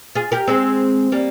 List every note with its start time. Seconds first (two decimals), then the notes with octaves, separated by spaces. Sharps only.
0.15 F4 G#4
0.32 G4 A#4
0.47 G#3 C4
1.12 G3 A#3